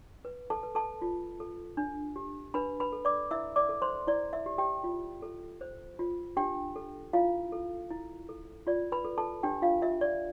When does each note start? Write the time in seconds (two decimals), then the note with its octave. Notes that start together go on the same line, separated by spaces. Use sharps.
0.25 B4
0.50 A4 A5
0.63 B4
0.75 A4 A5
1.02 F4
1.40 A4
1.77 D4
2.16 G4
2.54 D4 B4 B5
2.80 B4 B5
2.92 A4
3.05 D5 D6
3.31 E4 E5 E6
3.56 D5 D6
3.69 A4
3.82 C5 C6
4.07 E4 D5
4.33 E5
4.46 G4
4.58 G4 G5
4.84 F4
5.22 A4
5.61 C5
5.99 F4
6.37 D4 G4 G5
6.76 A4
7.13 E4 F4 F5
7.52 A4
7.90 E4
8.29 A4
8.67 F4 D5
8.92 B4 B5
9.05 A4
9.18 A4 A5
9.43 D4 G4 G5
9.62 F4 F5
9.82 F4 E5
10.01 D5